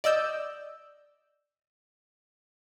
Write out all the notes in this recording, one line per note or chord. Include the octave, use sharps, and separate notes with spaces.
D5 D#5 E6 G6